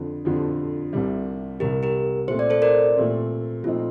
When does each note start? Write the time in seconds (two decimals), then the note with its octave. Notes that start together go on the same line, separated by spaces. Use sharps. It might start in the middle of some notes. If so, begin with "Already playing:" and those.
Already playing: F2 D3 F3
0.25 F2 D3 F3
0.93 C2 C3 G3
1.60 C2 C3 G3 G4 A#4
1.83 G4 A#4
2.28 A#2 A3 C4 C5
2.39 D5
2.50 A4 C5
2.62 A#4 D5
2.97 A#2 A3 C4
3.63 A#2 F3 A3 C4 D#4 F4